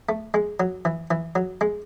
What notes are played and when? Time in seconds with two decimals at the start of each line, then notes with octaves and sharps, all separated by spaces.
0.09 A3
0.34 G#3
0.60 F#3
0.85 E3
1.11 E3
1.35 F#3
1.61 G#3